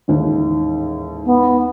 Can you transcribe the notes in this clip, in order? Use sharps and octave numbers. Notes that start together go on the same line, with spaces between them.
A1 D#2 G#2
B3